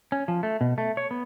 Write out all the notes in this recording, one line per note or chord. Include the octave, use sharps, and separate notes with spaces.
C#4
F3
A3
B2
A3
C#5
B3